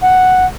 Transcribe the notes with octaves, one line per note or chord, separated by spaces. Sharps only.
F#5